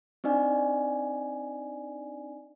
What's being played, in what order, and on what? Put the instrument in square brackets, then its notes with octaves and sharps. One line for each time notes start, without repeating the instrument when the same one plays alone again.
[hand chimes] C4 D4 D#4 D5 G#5